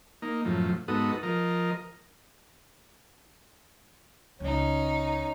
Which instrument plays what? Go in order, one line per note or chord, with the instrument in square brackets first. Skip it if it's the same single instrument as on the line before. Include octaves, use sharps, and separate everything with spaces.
[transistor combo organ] A#3 D#4
F#2 A2 F3
G#2 B3 D#4 F#4 A4 D#6
F3 A#4 D#5
[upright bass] C#2 [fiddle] C#4 D#4